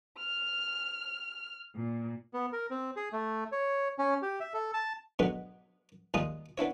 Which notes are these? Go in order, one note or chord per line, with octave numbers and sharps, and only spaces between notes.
F6
A#2
B3
A#4
C4
G#4
A3
C#5
C#4
G4
E5
A4
A5
B2 D3 F#3 G#3 B3
D#2 G3 G#3 F4 D#6
B3 D4 E4 C#5